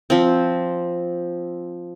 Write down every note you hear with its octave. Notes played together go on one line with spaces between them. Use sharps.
F3 C4